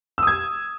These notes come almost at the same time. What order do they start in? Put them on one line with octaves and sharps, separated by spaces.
E6 D#6 G#6